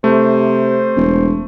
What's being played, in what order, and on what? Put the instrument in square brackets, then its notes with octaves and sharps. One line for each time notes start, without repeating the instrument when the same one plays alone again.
[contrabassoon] C3 [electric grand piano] A3 [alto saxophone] C5
[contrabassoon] E1